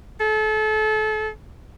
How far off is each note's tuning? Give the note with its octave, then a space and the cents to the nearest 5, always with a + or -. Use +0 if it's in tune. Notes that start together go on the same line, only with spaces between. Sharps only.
A4 -30